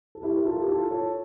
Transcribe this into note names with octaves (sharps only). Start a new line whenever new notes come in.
A4
E4 G4
A#4
F4 A4
G4
F4 A4
A4 C#5